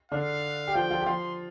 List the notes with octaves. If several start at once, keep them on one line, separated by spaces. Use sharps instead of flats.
D3 D4 F5
G4
F3 F4 G5
F3 F4
G4
F3 F4 C6